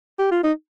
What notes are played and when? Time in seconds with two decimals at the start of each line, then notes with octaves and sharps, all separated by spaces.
0.19 G4
0.31 F4
0.43 D#4